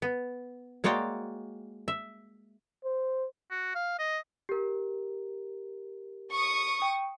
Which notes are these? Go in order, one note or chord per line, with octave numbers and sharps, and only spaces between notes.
B3
G#3 A#3 F#4 C#5 D5 G5
E5
C5
F#4
F5
D#5
G4 A#4
C#6 D#6
G5